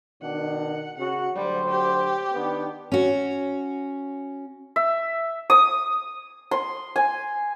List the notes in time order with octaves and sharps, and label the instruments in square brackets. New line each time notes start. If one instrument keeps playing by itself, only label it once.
[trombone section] B2 D#3 D4 [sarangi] F#5
[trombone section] C#3 F#4 [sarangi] F#5
[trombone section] D2 F#3 C5 [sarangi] G3
[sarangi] G4
[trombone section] D#3 B3 D4
[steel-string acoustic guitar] C#4 F#4
[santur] E5
D#6
C6
G#5